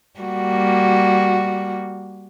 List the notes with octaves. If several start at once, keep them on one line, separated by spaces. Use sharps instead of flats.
G3 A#3 F#4